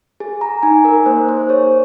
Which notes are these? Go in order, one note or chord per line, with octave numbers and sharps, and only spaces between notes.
G#4
A#5
D#4 G#5
A#4
A#3 C5
C5
G#4 C#5